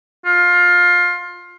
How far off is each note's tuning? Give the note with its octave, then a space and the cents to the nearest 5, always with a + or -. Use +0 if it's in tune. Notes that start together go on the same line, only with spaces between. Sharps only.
F4 +20